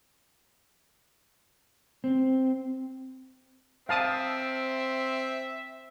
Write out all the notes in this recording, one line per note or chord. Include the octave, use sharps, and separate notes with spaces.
C4
C4 E5 F5 A5 D#6